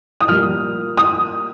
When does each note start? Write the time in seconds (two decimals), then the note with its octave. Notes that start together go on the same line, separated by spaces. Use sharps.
0.21 D#6
0.28 A#2 G3 A#3 F6
0.97 D#6